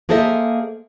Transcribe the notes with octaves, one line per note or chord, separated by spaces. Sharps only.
A#3 G#4 A4 C5 D#5 E5